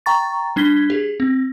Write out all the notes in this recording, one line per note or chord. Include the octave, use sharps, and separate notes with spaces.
G5 A#5 C#6 A6
G3 D4 G#6 B6 G7
G4 G#4
C4